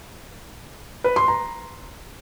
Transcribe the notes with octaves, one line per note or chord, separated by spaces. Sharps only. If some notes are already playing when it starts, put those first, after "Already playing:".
B4
C6
A#5